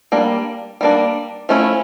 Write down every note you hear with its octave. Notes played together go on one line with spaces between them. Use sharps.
G3 A#3 D4
G3 A#3 D4
F3 A3 C#4 E4